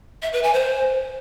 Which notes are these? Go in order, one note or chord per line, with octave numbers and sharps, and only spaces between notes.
E5
B4
G#5
C5